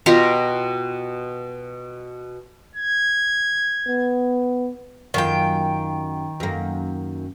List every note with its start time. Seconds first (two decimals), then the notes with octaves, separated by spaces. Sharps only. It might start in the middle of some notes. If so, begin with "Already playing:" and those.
0.06 B2 F4 G4 A#5
2.75 G#6
3.87 B3
5.14 F#2 D#3 A#3 F4 G5
6.40 F#2 A#3